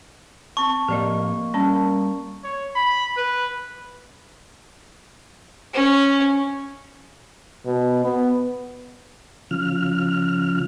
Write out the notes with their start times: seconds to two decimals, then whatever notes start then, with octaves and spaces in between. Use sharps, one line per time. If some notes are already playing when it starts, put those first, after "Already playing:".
0.57 C4 A5 C#6
0.88 A2 F3 A#3 G4 D5 D#5
1.54 G3 C#4 A5
2.44 C#5
2.76 B5
3.17 B4
5.73 C#4
7.66 B2
8.04 B3
9.51 C#3 F3 F6